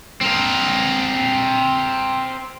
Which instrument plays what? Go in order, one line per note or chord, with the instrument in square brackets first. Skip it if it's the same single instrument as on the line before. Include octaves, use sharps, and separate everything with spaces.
[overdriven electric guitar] C4 A#4